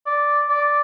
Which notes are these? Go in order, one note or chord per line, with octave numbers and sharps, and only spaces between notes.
D5
D5